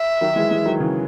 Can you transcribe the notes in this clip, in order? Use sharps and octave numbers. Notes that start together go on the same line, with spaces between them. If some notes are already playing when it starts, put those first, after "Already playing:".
Already playing: E5
D#3 F#3
E3 G#3
E3 G#3
D#3 F#3
C#3 E3